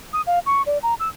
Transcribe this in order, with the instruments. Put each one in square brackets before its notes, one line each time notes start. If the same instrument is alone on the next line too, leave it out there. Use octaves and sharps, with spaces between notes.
[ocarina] D#6
F5
C#6
D5
A#5
E6